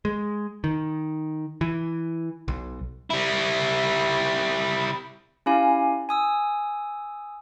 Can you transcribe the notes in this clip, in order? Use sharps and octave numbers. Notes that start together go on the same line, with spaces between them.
G#3
D#3
E3
B1
G3 E4
C#4 E4 G4 F5 G#5
G#5 D#6 E6